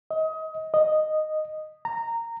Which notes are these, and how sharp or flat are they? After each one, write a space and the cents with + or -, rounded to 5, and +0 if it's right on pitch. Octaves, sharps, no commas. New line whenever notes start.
D#5 +30
D#5 -5
A#5 -15